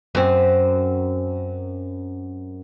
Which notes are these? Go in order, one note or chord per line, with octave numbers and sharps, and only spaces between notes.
F#2 C4